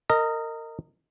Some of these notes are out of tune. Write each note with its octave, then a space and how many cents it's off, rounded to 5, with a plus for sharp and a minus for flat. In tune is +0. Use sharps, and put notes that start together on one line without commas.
A#4 -25 D#5 +0